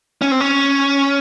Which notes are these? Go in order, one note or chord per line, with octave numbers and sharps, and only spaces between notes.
C#4
C4
C#4